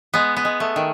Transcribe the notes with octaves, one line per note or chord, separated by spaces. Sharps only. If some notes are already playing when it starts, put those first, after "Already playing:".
G#3 B3
B3
G#3
A3
D#3